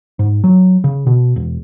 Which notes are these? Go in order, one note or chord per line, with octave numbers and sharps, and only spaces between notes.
G#2
F#3
C#3
B2
E1